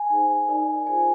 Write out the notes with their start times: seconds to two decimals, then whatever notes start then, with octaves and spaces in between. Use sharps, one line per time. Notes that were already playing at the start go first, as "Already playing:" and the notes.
Already playing: G#5
0.10 D#4 G#4 C5
0.48 D#4 A#4 D5
0.87 F4 G#4 C5 G#5